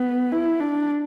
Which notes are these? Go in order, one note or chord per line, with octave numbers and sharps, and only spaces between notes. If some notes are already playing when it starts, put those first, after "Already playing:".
Already playing: B3
E4
D4